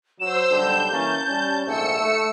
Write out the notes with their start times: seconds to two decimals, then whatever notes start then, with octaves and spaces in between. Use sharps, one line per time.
0.20 F#3 C5 E6 E7
0.51 B1 D3 G3 G6
0.92 E3 A#3 C#4 A5
1.28 G3 C#4
1.67 A#1 G#2 A3 E6 C#7
1.99 A3